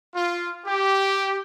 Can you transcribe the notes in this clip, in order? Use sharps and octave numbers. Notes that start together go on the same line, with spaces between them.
F4
G4